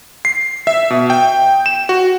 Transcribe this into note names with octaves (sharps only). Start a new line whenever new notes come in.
C7
E5
B2
G5
E7
F#4